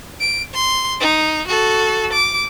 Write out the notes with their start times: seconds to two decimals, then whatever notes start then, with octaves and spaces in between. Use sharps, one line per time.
0.20 D7
0.54 C6
1.00 D#4
1.47 F#4 A4
2.12 D6